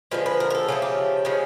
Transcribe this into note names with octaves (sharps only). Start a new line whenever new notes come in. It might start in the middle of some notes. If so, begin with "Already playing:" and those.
D3 F3 G#3 B4
B4
A#4
A#4
A4
C#3 F3 A3 G#4
G4
C#3 F3 G#3